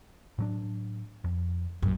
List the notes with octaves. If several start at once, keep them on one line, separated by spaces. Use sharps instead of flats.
A2 F#3 D4
F2
A#1 F#2 A#2